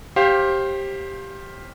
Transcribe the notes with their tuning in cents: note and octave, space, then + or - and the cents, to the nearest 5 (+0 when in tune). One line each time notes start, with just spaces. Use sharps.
G4 +0 C5 +25 F5 +0